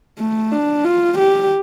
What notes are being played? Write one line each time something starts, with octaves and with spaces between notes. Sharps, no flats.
A3
D4
F4
G4